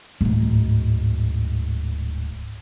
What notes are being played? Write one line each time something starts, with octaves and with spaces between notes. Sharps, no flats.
D1 G#2